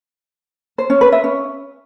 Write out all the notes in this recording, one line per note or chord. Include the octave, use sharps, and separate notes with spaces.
C5
C#4
B4
E5
C#4